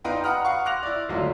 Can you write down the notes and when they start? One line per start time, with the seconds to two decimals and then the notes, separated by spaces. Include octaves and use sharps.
0.04 D4 D#4 B4 F5 G5 C6
0.24 F#5 A#5 B5 D#6 F6
0.45 F5 F#5 C#6
0.65 C6 D6 F#6 A#6 F7
0.83 E4 D5
1.09 G#1 D2 F#3 D4 F4